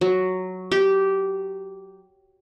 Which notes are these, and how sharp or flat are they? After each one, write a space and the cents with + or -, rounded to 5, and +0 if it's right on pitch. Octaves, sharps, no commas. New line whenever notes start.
F#3 +0
G4 -15